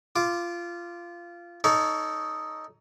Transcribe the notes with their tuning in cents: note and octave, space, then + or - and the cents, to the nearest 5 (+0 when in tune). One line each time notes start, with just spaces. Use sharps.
F4 -15 D6 +0
D#4 +0 A4 +0 C#5 +35